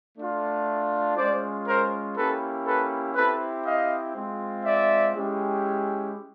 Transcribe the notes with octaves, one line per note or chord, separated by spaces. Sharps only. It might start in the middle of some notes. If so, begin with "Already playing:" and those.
A3 D4 F4
G#3 C#4 F4 C5 D5
A#4 C5
A#3 C#4 E4 G4 A4 B4
A4 B4
C4 E4 G4 A4 B4
D#5 F5
G#3 C4 F4
D5 E5
G#3 C#4 E4 G4